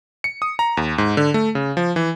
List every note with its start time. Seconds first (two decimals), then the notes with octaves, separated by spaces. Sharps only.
0.24 C#7
0.42 D#6
0.59 A#5
0.77 D#2
0.98 G#2
1.17 D3
1.34 A3
1.55 C#3
1.77 F3
1.96 E3